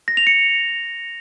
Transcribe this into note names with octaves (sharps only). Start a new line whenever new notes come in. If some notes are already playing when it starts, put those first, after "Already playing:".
A#6
F7
C#7